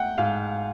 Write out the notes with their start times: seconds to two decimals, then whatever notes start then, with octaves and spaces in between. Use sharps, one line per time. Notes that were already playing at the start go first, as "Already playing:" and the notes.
Already playing: A3 F#5 G5
0.18 G#2 F5